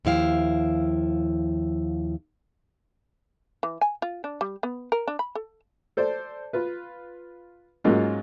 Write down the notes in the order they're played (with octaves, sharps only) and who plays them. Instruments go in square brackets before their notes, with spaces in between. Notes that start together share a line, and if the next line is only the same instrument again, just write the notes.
[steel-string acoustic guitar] D#2 F3 E4 F5 G5
[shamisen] E3
G#5
F4
D4
G3
B3
A#4
D4
B5
A4
[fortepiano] A4 C5 D5
F4 B4
G#2 F#3 G#3 A#3 C#4 F4